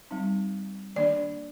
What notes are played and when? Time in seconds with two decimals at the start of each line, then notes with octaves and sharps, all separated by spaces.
0.11 G3 C4 D#4
0.96 D#3 A#3 D4 D5